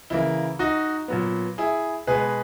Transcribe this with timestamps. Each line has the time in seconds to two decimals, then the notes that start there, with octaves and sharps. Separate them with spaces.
0.10 C#3 E3 A#3 E4
0.59 D#4 F#4
1.08 A#2 F#3 B3
1.58 E4 G#4
2.07 B2 G#3 B3 G#4 B4